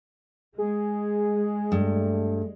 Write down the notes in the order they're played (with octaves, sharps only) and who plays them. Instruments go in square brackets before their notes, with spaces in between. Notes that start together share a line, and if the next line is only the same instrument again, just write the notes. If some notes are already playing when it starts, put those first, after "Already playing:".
[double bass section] G#3 [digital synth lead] G#4
[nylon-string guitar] G2 [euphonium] A3